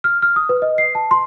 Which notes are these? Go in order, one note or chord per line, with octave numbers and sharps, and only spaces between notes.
F6
F6
D#6
B4
D#5
C7
A5
C6